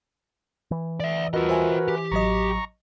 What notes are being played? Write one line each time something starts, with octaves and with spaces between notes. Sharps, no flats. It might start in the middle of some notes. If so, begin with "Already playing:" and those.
E3
D5 E5
F4 F#4 A#4 B4 D#5
C5 E5 G#5
G4
A1 F#3 D#5 A#5 C#6